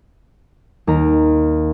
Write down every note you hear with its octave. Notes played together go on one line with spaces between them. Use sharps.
D#2 A#5